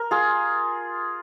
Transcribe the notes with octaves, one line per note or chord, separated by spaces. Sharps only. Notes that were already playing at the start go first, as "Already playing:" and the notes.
Already playing: A#4
F4 G#4